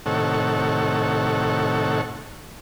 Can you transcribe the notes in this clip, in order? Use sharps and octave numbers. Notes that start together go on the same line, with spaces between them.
A2 C3 D#3 A4 C#5 F#5